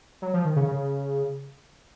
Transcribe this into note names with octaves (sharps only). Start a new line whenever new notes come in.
F#3
F3
D#3
C#3
C#3